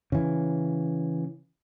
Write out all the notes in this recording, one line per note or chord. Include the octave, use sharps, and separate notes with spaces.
C#3 E3